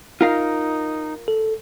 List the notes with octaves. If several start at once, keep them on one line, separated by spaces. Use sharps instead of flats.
D#4 F4 A#4 F5
A4